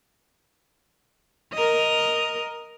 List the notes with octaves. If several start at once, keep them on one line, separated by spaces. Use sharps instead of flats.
A#4 D#5